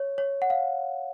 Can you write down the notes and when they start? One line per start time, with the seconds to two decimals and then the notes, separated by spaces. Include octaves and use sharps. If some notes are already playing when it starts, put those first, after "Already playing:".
Already playing: C#5
0.18 C#5
0.42 F#5
0.50 F5